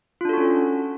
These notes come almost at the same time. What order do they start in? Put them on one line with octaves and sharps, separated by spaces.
F4 D4 A4 F#4 C#4